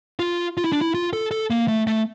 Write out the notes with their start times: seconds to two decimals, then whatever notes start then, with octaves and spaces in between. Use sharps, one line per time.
0.19 F4
0.57 F4
0.64 E4
0.73 D4
0.81 E4
0.94 F4
1.13 A4
1.31 A4
1.50 A#3
1.68 A3
1.87 A3